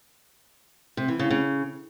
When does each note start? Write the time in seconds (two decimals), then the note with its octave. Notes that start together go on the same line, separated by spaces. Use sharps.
0.97 C3
1.08 E3
1.19 C#3
1.30 C#3